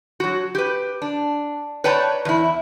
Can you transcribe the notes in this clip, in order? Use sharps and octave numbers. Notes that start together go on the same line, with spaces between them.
F#3 F#4
G4 B4
D4
B4 C#5 D5 G5 A5 A#5
E2 E4